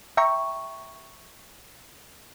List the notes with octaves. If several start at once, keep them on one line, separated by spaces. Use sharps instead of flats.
E5 G5 A#5 C#6